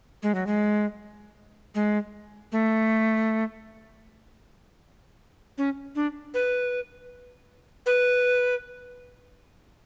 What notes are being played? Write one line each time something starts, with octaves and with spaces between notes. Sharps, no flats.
G#3
F#3
G#3
G#3
A3
C#4
D4
B4
B4